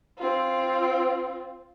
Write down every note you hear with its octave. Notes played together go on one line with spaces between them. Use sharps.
C4 F4